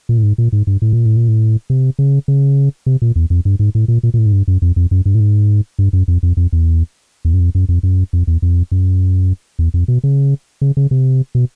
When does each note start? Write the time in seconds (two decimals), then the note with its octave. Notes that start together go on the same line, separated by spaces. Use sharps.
0.09 A#2
0.18 A2
0.23 G#2
0.38 A#2
0.52 G#2
0.67 G2
0.82 A2
0.93 A#2
1.06 A2
1.16 A#2
1.28 A2
1.70 C3
1.99 C#3
2.28 C#3
2.86 C3
3.02 A#2
3.16 E2
3.30 F2
3.45 G2
3.59 G#2
3.75 A2
3.88 A#2
4.03 A#2
4.14 A#2
4.18 A2
4.26 G#2
4.33 G2
4.48 F#2
4.62 F2
4.76 F2
4.91 F#2
5.06 G2
5.15 A2
5.20 G#2
5.79 G2
5.93 F#2
6.08 F2
6.23 F2
6.37 F2
6.53 E2
7.25 E2
7.34 F#2
7.40 F2
7.55 F#2
7.69 F2
7.83 F#2
8.13 F2
8.27 E2
8.42 F2
8.72 F#2
9.59 E2
9.74 F2
9.88 B2
10.04 C#3
10.61 C#3
10.77 C#3
10.91 C3
11.35 B2